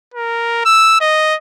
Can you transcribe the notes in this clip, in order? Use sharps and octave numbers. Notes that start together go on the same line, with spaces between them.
A#4
E6
D#5